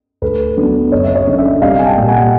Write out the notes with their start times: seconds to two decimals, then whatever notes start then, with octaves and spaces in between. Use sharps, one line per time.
0.22 D2 A4 B4
0.57 D3 F#3 B3 D4
0.92 F#1 C#5 D#5
1.04 E5
1.15 C#5 D#5
1.27 F#2 D3
1.38 D5 E5
1.62 C2 D#5 F5
1.79 G#5
1.85 G5 A5
1.97 A#2 G3
2.09 F#5 G#5